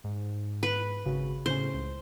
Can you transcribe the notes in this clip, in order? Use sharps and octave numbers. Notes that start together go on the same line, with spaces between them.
G#2
B4
G#1 C#3 F#4
A2 C#3 C#4 C5
C#2